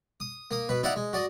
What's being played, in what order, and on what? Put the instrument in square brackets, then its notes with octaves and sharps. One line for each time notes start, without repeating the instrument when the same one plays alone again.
[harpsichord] D#6
A#3 D#6
B2 B4
D#4 E4 D5 F5 F#5
G#3
F#4 D5 D#5